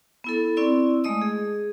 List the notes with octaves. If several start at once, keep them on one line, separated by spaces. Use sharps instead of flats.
B3 E4 A4
C4 E4 D5 C#6
G#3 A3 D#5 D#6
G#4